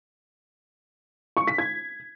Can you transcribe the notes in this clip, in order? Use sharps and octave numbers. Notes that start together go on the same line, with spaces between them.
C#6
B6
G#6